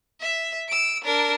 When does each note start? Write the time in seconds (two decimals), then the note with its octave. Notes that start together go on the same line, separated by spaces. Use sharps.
0.20 E5
0.68 E6 D7
1.04 D4 A#4